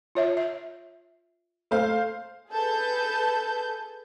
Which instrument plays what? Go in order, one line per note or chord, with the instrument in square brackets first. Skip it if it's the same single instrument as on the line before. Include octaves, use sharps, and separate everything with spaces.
[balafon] F4 C#5 E5
E5
[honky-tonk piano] A3 C5 F5 [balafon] A4
[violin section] G#4 A4 B4 A5 G6